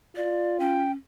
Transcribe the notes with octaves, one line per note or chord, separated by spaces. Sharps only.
F4 D5
C#4 G5